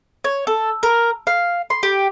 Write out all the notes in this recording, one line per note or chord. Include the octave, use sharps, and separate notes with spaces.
C#5
A4
A#4
F5
C6
G4